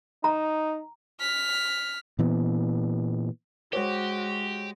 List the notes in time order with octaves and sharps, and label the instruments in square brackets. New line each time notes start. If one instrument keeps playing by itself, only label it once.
[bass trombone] D#4 [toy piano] A#5
[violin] F6 B6
[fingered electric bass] A#2 E3 B3
[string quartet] G#3 [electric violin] F#4 [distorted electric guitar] G4 [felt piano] C5 C#5